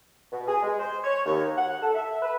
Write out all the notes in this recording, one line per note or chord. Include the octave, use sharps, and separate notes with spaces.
B2
G#4
G#3
C5
C#5
D#2
F#5
A4
E5
B4